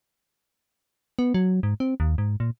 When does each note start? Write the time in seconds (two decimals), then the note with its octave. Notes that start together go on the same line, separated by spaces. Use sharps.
1.19 B3
1.34 F#3
1.63 G#2
1.80 C4
2.00 D#2
2.18 G#2
2.40 A#2